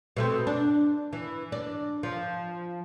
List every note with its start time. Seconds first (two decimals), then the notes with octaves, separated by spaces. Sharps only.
0.17 B2 A3 C4
0.47 D4
1.13 E3
1.52 D4
2.03 F3